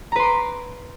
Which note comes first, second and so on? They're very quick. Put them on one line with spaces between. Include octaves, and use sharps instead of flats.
A#5 B4 C6 D6